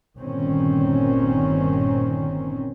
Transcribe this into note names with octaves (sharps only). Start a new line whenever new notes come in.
G1 A#2 D#3 C4 C#4